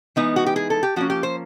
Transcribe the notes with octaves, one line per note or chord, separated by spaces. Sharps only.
E3 G#3 B3 D#4
F#4
G4
G#4
A4
G4
F3 A#3 C#4 F#4
G4
C5